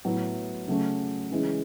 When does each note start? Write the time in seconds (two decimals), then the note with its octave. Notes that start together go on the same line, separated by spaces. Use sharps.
0.05 A2 F#3 B3 E4
0.67 C#3 F#3 A3 C#4
1.31 C#3 E3 G#3 C#4